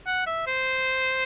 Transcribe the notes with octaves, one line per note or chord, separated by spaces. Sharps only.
F#5
E5
C5